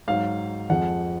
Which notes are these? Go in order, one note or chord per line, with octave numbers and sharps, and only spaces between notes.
G#2 F#3 F5
F2 F3 G#3 F#5